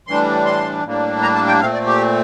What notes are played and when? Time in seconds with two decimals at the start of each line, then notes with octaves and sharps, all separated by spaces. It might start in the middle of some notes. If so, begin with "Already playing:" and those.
0.07 A2 E3 G3 D4 C6
0.45 C6
0.84 A2 G3 A#3 D4
1.22 A#5
1.35 A5
1.48 G5
1.60 A#2 A3 C4 F5
1.73 D5
1.87 G4